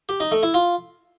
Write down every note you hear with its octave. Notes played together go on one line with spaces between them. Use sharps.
G4
D#4
A3
E4
F4